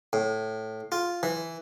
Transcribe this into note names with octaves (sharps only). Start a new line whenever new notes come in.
A2
F4
E3